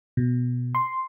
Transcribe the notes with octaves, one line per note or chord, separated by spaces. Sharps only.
B2
C6